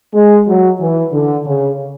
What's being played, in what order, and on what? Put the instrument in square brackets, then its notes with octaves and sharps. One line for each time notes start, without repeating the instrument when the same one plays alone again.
[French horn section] G#3
F#3
E3
D3
C#3